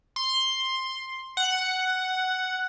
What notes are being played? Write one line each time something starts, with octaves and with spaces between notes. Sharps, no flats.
C6
F#5